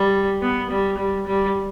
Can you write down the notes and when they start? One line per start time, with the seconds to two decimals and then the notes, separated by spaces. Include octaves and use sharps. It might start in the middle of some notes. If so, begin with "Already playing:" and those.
Already playing: G3
0.42 B3
0.70 G3
0.98 G3
1.27 G3